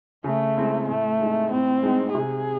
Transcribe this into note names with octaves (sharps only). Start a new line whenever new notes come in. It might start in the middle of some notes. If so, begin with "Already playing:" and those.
C#3 A3
G#3 C4 E4
A2 A3
G#3 D#4
A2 C4
G#3 D#4
C3 G#4